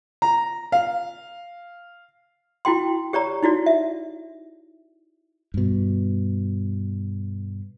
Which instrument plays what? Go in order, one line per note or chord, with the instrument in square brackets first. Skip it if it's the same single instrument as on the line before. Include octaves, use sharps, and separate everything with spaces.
[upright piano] A#5
F5
[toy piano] E4 F#4 G5 C6
G4 C#5 D5 A#5
D#4 E4 F#4 D5
E5
[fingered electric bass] G2 B2